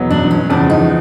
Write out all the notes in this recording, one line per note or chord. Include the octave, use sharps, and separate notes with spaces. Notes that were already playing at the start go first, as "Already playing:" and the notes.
Already playing: E2 B2 F#3 B3
D4
C#4
E2 C#3 F3 D4
D#4